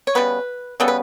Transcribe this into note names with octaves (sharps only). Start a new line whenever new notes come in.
C#5
C#3 G3 B3 B4
C#3 G3 B3 A4
B4